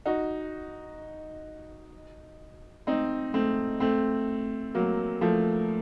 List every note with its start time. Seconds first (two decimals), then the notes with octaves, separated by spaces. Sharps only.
0.06 D#4 F#4
2.87 C4 D#4
3.34 A3 C4
3.80 A3 C4
4.75 F#3 A#3
5.21 F3 A3